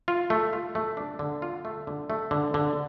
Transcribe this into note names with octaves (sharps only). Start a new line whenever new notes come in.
F4
A3
F4
A3
D4
D3
F4
A3
D3
A3
D3
D3